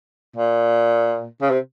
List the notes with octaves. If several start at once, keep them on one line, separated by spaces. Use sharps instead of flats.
A#2
C#3
C3